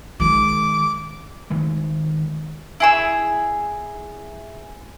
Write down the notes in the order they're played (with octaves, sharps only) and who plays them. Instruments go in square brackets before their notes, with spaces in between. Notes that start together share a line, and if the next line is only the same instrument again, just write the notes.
[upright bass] D#3 G#3 [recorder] D6
[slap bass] D#3 G#3 A3
[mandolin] E4 G#4 E6